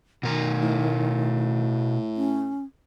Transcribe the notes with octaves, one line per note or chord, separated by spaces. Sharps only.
B2 D#3 A#4
A2
C#4